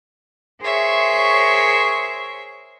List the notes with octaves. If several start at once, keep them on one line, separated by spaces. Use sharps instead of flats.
G#4 A#4 C5 C#5 E5 C#6